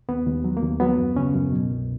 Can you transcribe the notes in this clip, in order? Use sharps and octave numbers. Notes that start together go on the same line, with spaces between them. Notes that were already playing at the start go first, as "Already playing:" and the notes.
D#2 B3
D#2
F#3
A#3
D#2
F#3 B3
F#2
C#3 C#4
F#2
B2
C2